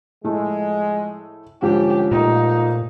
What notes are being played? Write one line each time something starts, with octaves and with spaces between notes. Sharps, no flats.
A2 F3 G#3 A3
C2 G#2 D3 F3 C#4 G4
A#2 A3 A#3 D#4